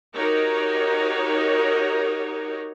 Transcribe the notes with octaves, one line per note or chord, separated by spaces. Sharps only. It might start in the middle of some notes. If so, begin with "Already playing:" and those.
D#4 F#4 G4 A#4 C#5